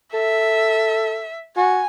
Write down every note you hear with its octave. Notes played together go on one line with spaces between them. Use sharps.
A4 E5
F#4 G#5